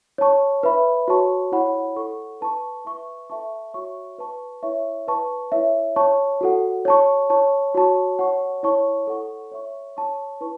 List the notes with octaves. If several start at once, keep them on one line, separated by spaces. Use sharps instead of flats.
C#5 A5 C#6
B4 E5 B5
F#4 C#5 A5 C#6
E4 C#5 F#5 B5
A4 F#5 C#6
B4 A5 C#6
B4 E5 C#6
A4 E5 A5 C#6
F#4 C#5 E5 C#6
B4 A5 C#6
E4 C#5 E5 C#6
B4 A5 C#6
E4 C#5 E5
C#5 A5 C#6
F#4 A4 F#5
C#5 A5 C#6
C#5 A5 C#6
F#4 C#5 A5 C#6
C#5 F#5 A5 C#6
E4 C#5 A5 C#6
A4 F#5 C#6
C#5 E5 C#6
C#5 A5 C#6
E4 B4 A5 C#6